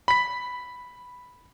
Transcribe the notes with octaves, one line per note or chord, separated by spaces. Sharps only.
B5 B6